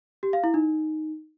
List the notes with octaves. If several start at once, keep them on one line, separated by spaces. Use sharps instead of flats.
G4
F5
E4
D#4